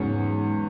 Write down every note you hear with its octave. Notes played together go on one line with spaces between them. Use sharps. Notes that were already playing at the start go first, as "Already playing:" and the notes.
Already playing: E2 G#2 C#3 F#3 C#4